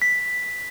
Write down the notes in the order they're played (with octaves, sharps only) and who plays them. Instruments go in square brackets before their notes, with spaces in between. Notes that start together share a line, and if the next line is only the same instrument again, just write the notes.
[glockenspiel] B6